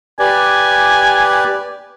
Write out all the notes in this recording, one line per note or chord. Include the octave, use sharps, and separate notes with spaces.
G4 B4 D5 G#5